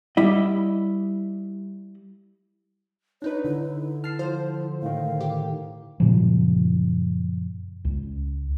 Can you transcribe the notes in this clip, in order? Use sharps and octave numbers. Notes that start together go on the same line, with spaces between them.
G3 E4 D#5
D4 D#4 B4 C#5
D3 E4
A5 F6 C7
F3 C5
A2 D#3 F5
G4
F#2 A#2 C#3 F3
C#2